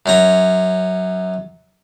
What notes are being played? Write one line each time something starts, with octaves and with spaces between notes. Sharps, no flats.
F#2 C#4 A#5